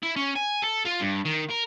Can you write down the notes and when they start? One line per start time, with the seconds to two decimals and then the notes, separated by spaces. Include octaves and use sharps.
0.03 E4
0.16 C#4
0.35 G#5
0.62 A4
0.85 F4
1.00 G2
1.25 D#3
1.50 A#4